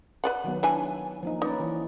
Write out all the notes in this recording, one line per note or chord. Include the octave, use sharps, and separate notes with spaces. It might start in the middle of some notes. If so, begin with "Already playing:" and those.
B4 D5 F#5
D#3 F#3 B3
E3 D4 G#5
F3 A#3 D#4
C#4 D#4 B4 D5
E3